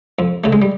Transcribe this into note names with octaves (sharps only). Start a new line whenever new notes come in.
F2
C#3 A3
G#3
G3